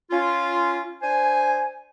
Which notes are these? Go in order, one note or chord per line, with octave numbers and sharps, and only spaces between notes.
C#4 F4
D4 C5 G#5